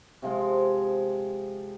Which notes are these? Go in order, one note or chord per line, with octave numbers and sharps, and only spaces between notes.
C3 F3 G#3